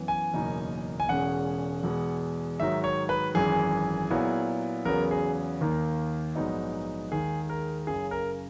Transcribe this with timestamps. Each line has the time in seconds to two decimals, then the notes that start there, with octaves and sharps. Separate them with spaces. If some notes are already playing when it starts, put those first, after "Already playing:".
Already playing: F#2 E3 B3
0.08 G#5
0.33 F#1 E2 B2 A#3 D#4
1.00 G#5
1.09 E1 E2 C#3 G#3 C#4 F#5
1.83 E2 B2 G#3 B3
2.60 G#2 D#3 F#3 E5
2.84 C#5
3.09 B4
3.35 G#1 F#2 E3 G#4
4.10 A#2 F#3 B3 E4
4.85 E2 C#3 F#3 B3 A#4
5.11 G#4
5.61 D#2 D#3 A#3
6.35 A#1 G#2 F#3 B3 D#4
7.12 D#2 D#3 G#3 G#4
7.49 A#4
7.87 F#1 F#2 C#3 G#4
8.11 A#4